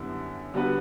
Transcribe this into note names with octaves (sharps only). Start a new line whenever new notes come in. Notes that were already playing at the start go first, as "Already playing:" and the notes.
Already playing: F#2 D3 G3 B3 E4
D3 G3 B3 F#4 B4